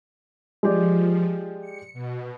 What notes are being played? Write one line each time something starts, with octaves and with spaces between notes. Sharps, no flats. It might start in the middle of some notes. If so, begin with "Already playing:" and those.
F3 G#3 G4 D5
C#7
B2